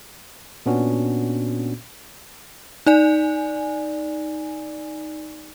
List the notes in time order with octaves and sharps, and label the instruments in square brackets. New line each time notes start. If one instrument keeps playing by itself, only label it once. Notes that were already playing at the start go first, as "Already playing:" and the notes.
[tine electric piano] A#2 B3 C#4 D4 F#4
[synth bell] D#4 D5 G#5